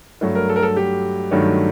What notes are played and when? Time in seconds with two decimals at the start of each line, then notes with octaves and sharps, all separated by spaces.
0.21 G2 F#3 A3
0.35 A#4
0.49 A4
0.56 A#4
0.62 A4
0.76 G4
1.31 G2 D#3 F#3 A3